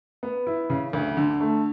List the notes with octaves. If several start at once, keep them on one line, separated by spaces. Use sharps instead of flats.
B3
E4
C#3
D2
D3
A3